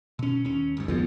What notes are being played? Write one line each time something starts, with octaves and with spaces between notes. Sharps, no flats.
B2 C#4
D#2 C#4
G1 D#2 G#2
A1 F2 B3 F4